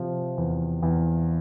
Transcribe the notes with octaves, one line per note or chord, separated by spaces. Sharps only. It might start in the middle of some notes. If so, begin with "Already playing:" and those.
Already playing: C3 F3
E2
E2